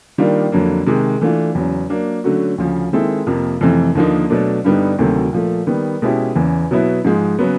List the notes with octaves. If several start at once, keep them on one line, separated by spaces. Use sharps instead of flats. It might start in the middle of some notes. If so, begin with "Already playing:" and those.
D#3 G3 A#3 D4 F4
F2 D3 F#3 A#3
C3 D#3 G#3
E3 A3 D4 F4
E2 C#3 F#3
F#3 A#3 D4
D3 F#3 A3 C#4 F#4
D2 C#3 F3
D#3 G#3 C4 E4 A4
F2 C3 F3 A#3
F2 C3 E3 A3 C4
D#2 D3 F3 A#3 D#4
B2 F#3 A3 D4
G2 D3 G3 B3 D#4
D2 C3 D#3 F#3 A3
A#2 F3 A3
D#3 G3 B3
B2 G#3 C#4 E4 G4
E2 C#3 E3
B2 F#3 B3 E4
G#2 F3 G#3
C#3 F#3 B3